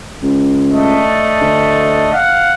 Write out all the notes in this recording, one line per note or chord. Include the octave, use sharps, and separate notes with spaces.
C#2
A3 D4 D#5
D2
F5 F#5